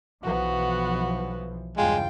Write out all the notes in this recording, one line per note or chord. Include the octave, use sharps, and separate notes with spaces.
B1 E3 F3 B3 F#4
E2 G2 C#3 G#3 F4 G5